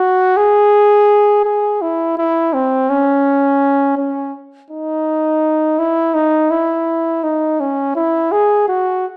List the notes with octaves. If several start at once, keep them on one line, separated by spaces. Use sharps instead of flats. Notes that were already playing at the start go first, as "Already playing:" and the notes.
Already playing: F#4
G#4
G#4
E4
E4
C4
C#4
C#4
D#4
E4
D#4
E4
D#4
C#4
E4
G#4
F#4